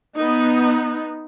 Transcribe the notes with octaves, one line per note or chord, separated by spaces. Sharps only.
B3 D#4